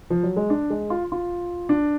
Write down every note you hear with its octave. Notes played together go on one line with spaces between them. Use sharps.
F3
F#3
G#3
D4
G#3
F4
F4
D4